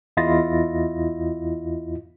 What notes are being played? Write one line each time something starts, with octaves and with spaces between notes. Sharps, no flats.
E2 E4 F4 D#5 A6 A#6